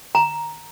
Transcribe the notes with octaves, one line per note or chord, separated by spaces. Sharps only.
A#5